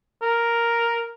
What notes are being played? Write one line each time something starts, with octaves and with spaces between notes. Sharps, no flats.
A#4